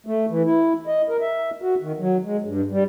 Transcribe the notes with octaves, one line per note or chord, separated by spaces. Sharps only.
A3
E3
E4
D#5
A#4
E5
F#4
D#3
F#3
G#3
G2
G3